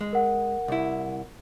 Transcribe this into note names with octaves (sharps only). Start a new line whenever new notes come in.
G#3
A#4 F#5
C2 E4